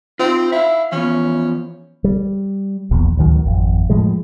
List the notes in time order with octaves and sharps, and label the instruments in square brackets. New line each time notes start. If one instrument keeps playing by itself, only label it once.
[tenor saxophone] C4 [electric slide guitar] D#4 F4
[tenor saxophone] E4 [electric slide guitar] E5 F5
[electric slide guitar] E3 F3 B3 [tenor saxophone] C#4
[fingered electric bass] G3
D#1 A#1 E2
A1 D2 D#3 F#3
G#1 F2
A2 F3 G#3